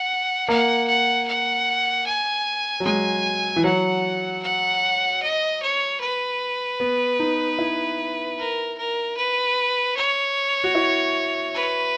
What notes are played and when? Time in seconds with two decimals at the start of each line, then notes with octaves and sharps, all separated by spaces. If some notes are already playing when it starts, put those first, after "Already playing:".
Already playing: F#5
0.49 A#3 F#5
0.88 F#5
1.27 F#5
2.06 G#5
2.80 F#3
2.85 G#3 G#5
3.56 E3
3.64 F#3 F#5
4.43 F#5
5.22 D#5
5.62 C#5
6.00 B4
6.80 B3
7.20 D#4
7.59 E4
8.38 A#4
8.78 A#4
9.17 B4
9.96 C#5
10.64 F#4
10.75 E4
11.54 B4